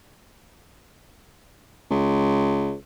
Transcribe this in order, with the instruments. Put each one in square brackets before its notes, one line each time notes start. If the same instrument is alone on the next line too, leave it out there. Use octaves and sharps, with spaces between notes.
[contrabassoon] C#2